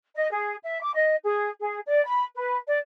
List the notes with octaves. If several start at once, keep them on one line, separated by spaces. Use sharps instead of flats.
D#5
G#4
E5
D6
D#5
G#4
G#4
D5
B5
B4
D5